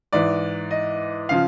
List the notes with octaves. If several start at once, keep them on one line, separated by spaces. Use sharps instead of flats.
G#2 E3 D5
D#5
C#3 F3 F5